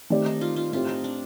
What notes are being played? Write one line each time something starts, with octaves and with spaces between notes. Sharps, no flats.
D#3 A3 C4 G4 D5
D#4
F4
F4
A2 A3 C4 F4 G4
D#4
D4